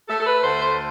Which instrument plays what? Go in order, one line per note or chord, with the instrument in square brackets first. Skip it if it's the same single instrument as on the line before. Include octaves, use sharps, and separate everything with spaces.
[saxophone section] A3 A4
A4
B4
D2 C5
C5